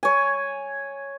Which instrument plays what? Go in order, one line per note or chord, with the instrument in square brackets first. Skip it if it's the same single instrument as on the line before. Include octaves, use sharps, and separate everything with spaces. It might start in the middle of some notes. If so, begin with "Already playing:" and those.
[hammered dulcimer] C#5 G#5